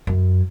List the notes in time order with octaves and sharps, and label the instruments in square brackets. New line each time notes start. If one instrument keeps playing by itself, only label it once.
[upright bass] F#2